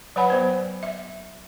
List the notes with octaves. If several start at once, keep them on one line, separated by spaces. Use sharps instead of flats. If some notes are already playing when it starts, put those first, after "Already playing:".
F#3 B4 C#5 F#5 G#5 B5
F#3 B3 C5
E5